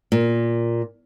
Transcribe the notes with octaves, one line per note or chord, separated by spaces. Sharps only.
A#2